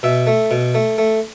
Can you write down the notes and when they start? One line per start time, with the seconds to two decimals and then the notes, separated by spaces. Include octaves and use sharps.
0.03 B2 E5
0.27 A3
0.51 B2
0.75 A3
0.98 A3